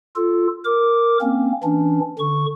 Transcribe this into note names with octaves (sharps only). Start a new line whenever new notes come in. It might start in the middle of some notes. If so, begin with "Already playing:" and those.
F4 A4
A#4 D6
A#3 C4 C#4
E3 C#4 D4
D3 C#6